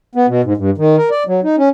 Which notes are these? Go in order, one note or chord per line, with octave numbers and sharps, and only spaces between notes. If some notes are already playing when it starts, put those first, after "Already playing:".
B3
B2
G#2
G2
D#3
A#4
D5
F#3
D#4
C#4